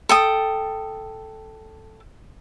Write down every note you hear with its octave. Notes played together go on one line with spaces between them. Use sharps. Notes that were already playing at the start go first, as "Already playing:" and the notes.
A4 G5 D#6